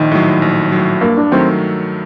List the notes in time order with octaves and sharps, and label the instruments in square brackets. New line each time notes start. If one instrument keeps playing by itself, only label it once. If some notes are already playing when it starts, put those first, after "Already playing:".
Already playing: [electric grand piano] A#1 [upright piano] D#3
[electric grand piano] A2 F#3
A#1
A2 F#3
[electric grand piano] G2 [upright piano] A#3
[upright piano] D4
[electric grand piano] D#3 F#3 A3 [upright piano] C4